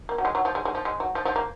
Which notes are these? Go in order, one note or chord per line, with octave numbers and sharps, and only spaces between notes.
A#3
F#3
G#3
F#3
F3
G#3
G#3
F3
G#3
F#3
F3
F3
A#3